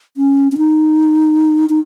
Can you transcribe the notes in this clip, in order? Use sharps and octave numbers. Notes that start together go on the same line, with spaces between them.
C#4
C#4
D#4
D#4